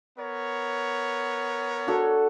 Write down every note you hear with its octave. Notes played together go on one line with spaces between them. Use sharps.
B3 A#4 C#5
D4 F#4 A4